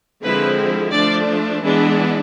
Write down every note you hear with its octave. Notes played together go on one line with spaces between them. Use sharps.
D3 F3 G#3 C4 E4 B4
F3 A3 D4 D5
E3 G#3 B3 D4